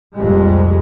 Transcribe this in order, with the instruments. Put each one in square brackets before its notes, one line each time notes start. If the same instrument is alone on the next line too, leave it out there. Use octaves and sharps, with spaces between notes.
[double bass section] F1 C2 F2 A#2 G3 G#3